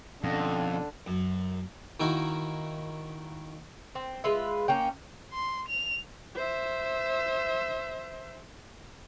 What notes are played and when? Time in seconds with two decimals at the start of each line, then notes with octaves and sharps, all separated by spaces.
0.24 F2 B2 D3 F3 C#4
1.07 F#2
2.00 D#3 A#3 D#4 E4 F#4 A#4
3.95 C4
4.24 G#3 F4 B4 E5
4.68 A#3 C#4 G5
5.33 C6
5.68 F7
6.36 C5 E5